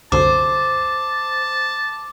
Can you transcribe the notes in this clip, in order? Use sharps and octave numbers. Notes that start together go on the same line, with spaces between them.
C2 F#2 D3 C5 A5 D6